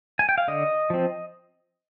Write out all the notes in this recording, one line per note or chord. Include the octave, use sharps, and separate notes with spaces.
G#5
G5
F5
D3 D#5
F3 C4